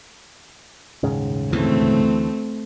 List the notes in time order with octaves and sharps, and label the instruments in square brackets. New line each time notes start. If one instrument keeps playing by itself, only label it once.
[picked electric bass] D#1 G#2 C#3
[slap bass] D2 E3 [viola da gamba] A3 C4